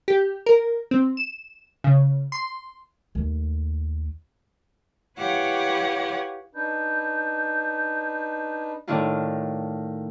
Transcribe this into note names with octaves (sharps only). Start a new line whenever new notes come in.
G4
A#4
C4
E7
C#3
C6
D#2 A3
E4 G4 B4 C#5 F5 F#5
D4 D#4 B4 G6
A2 D#3 D4 E4 F4